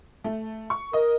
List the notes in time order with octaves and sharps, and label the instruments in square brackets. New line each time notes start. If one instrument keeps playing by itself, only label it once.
[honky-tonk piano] A3
C#6
[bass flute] A#4 [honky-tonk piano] D#5